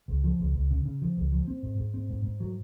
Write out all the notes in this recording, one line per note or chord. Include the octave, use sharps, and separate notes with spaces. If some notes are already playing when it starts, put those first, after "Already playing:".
C#2
F3
C#2
C#2
C#3
C#3
F3
C#2
F3
C4
G#2
G#2
C4
G#2
G#2
F#3